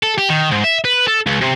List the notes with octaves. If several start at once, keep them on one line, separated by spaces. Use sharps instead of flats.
A4
G4
D#3
G#2
E5
B4
A4
C#2
C3